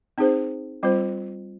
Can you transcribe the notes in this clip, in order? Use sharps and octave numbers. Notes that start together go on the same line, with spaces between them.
C4 D#4 G#4 C5
G3 C4 F4 C5